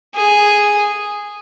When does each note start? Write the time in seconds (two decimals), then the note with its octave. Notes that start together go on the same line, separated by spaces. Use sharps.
0.15 G#4